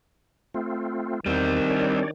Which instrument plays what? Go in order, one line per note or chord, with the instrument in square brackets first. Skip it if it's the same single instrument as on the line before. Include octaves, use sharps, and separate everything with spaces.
[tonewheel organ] A3 C4 F4
[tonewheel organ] E2 [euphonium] D#3 [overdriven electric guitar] G3 C4
[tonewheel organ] D4 C#5 D5